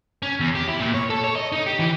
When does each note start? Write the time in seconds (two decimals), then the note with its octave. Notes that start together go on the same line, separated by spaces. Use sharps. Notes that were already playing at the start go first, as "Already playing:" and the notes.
0.22 C#4
0.40 E2
0.55 G4
0.68 E4
0.80 A#2
0.94 C#5
1.10 A4
1.24 C#5
1.36 D#5
1.52 D#4
1.67 G4
1.80 E3